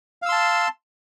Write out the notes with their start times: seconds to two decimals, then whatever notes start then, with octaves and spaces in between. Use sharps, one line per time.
0.22 F5
0.26 E6
0.29 C6
0.32 A5